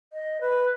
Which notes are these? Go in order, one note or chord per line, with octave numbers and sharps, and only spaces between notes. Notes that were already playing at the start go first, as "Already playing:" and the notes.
D#5
B4